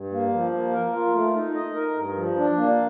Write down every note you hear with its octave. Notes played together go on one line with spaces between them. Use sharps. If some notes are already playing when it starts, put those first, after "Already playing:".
Already playing: G2
A#3
F3
A#3
A#4
F4
A3
D#4
D#5
A#4
G2
F3
D4
A#3